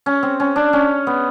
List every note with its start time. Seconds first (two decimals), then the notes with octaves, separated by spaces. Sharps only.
0.06 C#4
0.23 C4
0.40 C#4
0.56 D4
0.73 C#4
1.07 B3